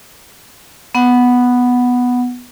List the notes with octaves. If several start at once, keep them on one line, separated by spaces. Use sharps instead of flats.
B3 F#5